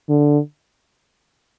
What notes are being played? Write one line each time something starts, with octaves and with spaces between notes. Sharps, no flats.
D3